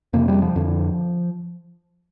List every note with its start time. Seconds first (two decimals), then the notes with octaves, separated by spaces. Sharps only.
0.13 F2 C3 A#3
0.28 G3
0.42 F3
0.56 F2 D3